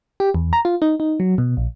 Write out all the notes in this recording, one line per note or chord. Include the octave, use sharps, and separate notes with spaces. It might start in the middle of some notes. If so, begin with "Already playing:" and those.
G4
E2
A#5
F4
D#4
D#4
F#3
B2
A#1